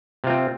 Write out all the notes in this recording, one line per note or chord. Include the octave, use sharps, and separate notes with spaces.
C3 C4 F4